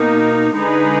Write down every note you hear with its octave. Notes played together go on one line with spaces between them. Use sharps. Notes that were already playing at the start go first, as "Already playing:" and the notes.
Already playing: B2 A#3 D#4
D3 G#3 D#4 G#4 B4